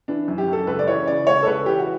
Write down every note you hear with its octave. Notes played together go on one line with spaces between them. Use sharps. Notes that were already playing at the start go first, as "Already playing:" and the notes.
E3 D4
F#2
G4
F#2 A4
C#2 B4
D5
E3 C#5
C#3 D5
C#2 C#5
A4
C#2 B4
E3 G4
F#4